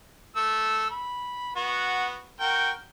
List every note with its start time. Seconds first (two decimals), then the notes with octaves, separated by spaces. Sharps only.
0.36 A3 E6
0.90 B5
1.56 B3 F#4
2.40 F#4 A#4 G5